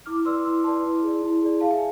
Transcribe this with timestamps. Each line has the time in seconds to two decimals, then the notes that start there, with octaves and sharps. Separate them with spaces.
0.06 E4 D6 F6
0.25 B4 D5 C6 E6
0.45 E4 C6 E6
0.64 B4 D5 A5 C6
0.84 E4
1.02 G#4 D5
1.22 E4
1.42 G#4 D5
1.60 G#4 F5 A5
1.71 E5 G#5